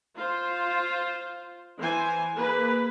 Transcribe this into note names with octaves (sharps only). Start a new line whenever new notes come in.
F4 C5
E3 C5 G#5
A#3 G#4 B4